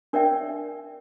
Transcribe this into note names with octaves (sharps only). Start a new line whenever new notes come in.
D4 A#4 C#5 D5 E5 G5